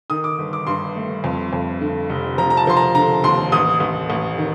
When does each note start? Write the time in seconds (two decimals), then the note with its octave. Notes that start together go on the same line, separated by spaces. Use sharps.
0.10 D#3 D#6
0.24 D6
0.38 G1
0.53 D6
0.67 G2 C6
0.96 A3
1.24 F2
1.53 F2
1.81 D3
2.10 F1
2.38 F3 A#5
2.50 A#5
2.57 A5
2.67 F3 C6
2.77 A#5
2.95 D3 A#5
3.24 D#2 C6
3.52 A1 D#6
3.80 A1
4.10 A1
4.38 D#3